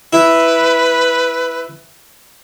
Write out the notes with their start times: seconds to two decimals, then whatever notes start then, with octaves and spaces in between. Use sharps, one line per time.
0.13 E4 B4